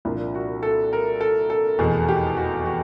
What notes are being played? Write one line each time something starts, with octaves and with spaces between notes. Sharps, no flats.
C2 A#2 F3 D4
F#4
A4
A#4
A4
A4
F1 E2 B2 G#4
G4
F#4
F#4